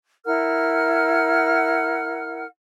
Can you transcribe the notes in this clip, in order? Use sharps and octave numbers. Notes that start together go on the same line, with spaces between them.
E4 A#4 F#5 F6